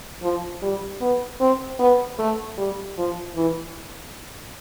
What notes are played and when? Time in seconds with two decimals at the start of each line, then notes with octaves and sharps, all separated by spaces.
0.22 F3
0.62 G3
1.01 B3
1.40 C4
1.79 B3
2.19 A3
2.57 G3
2.98 F3
3.36 E3